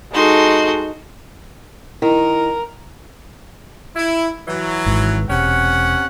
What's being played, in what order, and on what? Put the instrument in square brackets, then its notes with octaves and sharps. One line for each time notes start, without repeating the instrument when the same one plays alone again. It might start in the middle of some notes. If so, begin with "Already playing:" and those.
[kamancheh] G#3 A4 [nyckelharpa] D#4 [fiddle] F#4 C6
[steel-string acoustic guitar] D#3 [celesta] E4 [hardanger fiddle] A#4
[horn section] E4
E3 F#3
[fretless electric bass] G#1 G#2
[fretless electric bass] E1 [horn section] C3 C#4 F#5